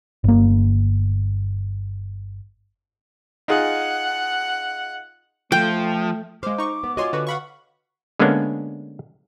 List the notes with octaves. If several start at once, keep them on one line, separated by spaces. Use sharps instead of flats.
G1 A#3
D#4 F4 G#4 F#5
F3 A3 G5
G#3 C5 F5 D6
D#4 C#6
B3 B4
F4 F#4 C#5 D#5 G#5 C6
D3 F#4 B4
F5 F#5 B5 C#6
D3 G#3 A#3 B3 C#4 D4